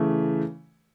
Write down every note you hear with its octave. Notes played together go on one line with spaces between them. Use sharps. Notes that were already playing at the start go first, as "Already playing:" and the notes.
Already playing: C#3 E3 A3